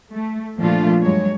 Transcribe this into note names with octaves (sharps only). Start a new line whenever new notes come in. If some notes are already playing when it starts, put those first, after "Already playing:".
A3
A#2 F3 A3 D4 F4
G2 F#3 G#3 C#5